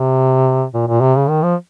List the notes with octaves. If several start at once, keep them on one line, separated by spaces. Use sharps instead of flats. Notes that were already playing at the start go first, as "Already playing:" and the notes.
Already playing: C3
A#2
A#2
C3
C#3
D#3
F3